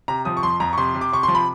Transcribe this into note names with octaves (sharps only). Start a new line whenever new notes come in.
C3 A#5
F3 D#6
C#6
F2 C6
F2 A#5
C#6
C3 C6
C3
D6
C3 C#6
F3 C6
B5